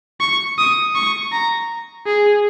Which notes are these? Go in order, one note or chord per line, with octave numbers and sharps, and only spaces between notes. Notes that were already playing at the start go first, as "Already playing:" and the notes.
C#6
D#6
C#6
A#5
G#4